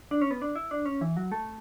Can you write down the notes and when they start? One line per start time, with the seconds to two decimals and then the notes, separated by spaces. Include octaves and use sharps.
0.11 D4
0.21 C#4
0.31 B3
0.42 D4
0.56 E4
0.71 D4
0.86 C#4
1.01 E3
1.17 F#3
1.32 A3